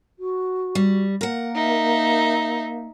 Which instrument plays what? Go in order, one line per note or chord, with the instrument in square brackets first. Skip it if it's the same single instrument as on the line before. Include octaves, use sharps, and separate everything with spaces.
[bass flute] F#4
[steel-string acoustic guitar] G3
[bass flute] A#3 [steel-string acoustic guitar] A#4 F#5
[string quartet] D#4 E5